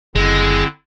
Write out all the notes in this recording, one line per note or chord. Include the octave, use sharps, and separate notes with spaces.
F#1 D3 G#3 C4 E4